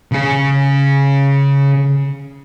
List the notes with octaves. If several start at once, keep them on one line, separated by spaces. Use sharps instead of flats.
C#3 G#4